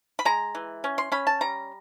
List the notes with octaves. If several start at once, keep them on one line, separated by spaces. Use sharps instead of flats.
B5
G#3 A#5
E3
C#4
C6
C#4 B5
A5
G3 A#5